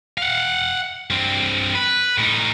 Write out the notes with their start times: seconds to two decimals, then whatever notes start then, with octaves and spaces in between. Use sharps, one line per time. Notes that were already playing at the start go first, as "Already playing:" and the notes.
0.18 F5 F#5
1.10 G2 C4
1.75 B4
2.18 A2 D#4